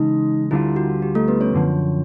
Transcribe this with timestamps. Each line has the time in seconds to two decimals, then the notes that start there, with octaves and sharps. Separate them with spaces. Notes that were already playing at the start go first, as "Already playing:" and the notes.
Already playing: C#3 E3 G#3 D#4
0.51 D2 D3 G3 C4 E4 F4
0.76 F#4
1.02 G4
1.15 A3 A4
1.28 B3 B4
1.41 C#4 C#5
1.54 F#2 D3 F3